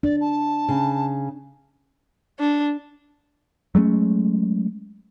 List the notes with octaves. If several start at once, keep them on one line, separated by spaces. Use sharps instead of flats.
D4 D5
A5
C#3
D4
F#3 G#3 A3 C#4